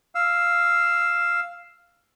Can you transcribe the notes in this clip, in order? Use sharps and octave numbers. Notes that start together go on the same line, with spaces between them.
F5 E6